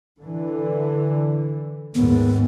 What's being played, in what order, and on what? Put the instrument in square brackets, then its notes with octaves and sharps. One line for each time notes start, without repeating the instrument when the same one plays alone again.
[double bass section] D3 E3
[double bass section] D#2 G#2 [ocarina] B3